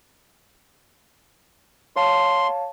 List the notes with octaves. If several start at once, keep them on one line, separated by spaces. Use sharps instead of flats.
C#5 F5 A5 C6